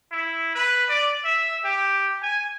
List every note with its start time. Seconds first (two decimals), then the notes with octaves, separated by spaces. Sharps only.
0.12 E4
0.55 B4
0.89 D5
1.24 E5
1.65 G4
2.22 G#5